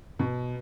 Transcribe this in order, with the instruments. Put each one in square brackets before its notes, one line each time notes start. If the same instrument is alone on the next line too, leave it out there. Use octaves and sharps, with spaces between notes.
[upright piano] B2